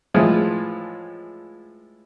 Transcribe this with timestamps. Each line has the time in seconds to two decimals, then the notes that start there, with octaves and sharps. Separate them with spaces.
0.14 A2 E3 F3 G#3